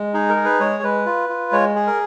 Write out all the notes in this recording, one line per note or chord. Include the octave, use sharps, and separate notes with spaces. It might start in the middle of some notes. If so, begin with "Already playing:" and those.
Already playing: G#3
D#4 G#4
A#4
G#4
B4
G#3 C#5
G#3 B4
F4
F4
G#3 C#5
G#4
A#4